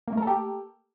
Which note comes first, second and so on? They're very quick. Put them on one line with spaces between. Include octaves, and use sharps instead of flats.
A#3 A3 A#4 A4 G4